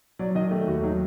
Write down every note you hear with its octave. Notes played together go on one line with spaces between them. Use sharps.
F#3 D5
D#3 D#5
A3 G4
D#2 F#4
F#3 D#4